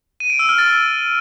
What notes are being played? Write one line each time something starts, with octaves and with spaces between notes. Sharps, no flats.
D#7
D7
E6
F6
A6